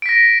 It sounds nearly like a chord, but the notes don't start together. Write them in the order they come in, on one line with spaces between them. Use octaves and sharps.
D7 B6 A#6